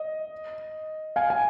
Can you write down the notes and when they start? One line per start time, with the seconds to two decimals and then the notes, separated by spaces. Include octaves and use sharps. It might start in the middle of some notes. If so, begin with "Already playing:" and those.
Already playing: D#5
1.16 F5 G#5
1.30 G#5